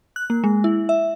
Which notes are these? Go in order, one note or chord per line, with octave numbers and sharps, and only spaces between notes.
F#6
A#3
G#3
E4
E5